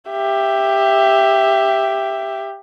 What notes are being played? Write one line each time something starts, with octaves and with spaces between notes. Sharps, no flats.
G4 E5